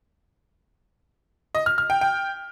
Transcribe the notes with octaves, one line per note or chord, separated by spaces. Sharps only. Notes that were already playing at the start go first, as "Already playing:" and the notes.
D#5
F6
F6
G5
G5